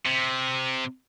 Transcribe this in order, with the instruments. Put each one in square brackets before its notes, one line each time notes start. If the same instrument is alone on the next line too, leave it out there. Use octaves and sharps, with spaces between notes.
[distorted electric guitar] C3